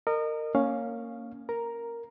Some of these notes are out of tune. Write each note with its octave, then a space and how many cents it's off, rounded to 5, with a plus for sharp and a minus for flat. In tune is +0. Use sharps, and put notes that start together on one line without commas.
A#4 -20 D#5 -30 D#6 -35
A#3 -15 C#4 +0 F5 +10
A#4 +0 A#5 +5